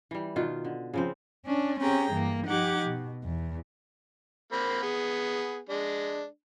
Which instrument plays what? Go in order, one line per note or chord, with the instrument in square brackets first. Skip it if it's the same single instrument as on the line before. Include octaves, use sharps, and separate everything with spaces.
[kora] E3 G3
B2 D#3 F4
D3
C#3 F3 C4
[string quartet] C#4 D4
C4 C#4 G4 G#4 G5 A#5
G2 E3 A#3
F3 D#4 G4 F#5 D6 G#6
B2
E2
[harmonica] A#3 C4 B5
B3 G#4
G#3 D4